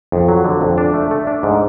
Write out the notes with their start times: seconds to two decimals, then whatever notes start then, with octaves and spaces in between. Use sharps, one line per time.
0.12 F2
0.29 F#3
0.44 D3
0.61 F2
0.78 D4
0.94 A3
1.11 A3
1.27 D4
1.43 G#2